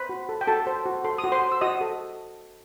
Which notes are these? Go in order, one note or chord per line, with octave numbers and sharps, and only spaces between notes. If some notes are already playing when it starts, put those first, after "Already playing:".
Already playing: B4 C5 B5
F#4
A4
G5
F#4 A4 A5
C5
F#4
A4 C6
D#6
F#4
C5 C6
C5
E6
F#4 D#5 D#6
A4